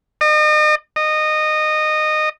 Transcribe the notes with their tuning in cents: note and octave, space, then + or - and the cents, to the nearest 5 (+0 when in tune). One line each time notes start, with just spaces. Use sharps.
D#5 -40
D#5 -20